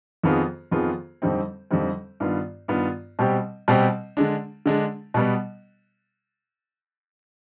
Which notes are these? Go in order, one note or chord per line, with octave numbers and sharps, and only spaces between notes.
F2 D#3 B3 F4 G#4
F2 D#3 B3 F4 G#4
F2 D3 G3 C4 D#4
F2 D3 G3 C4 D#4
G2 D#3 B3 F4
G2 D#3 B3 F4
B2 G3 C4 G4
B2 G3 C4 G4
D3 G#3 D4
D3 G#3 D4
B2 G3 B3